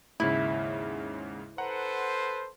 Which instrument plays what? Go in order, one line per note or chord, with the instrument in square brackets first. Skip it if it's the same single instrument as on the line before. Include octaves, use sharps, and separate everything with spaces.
[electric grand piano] D#2 G#2 C#3 [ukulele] E4
[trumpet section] A4 B4 C5 [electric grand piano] F#5 A#5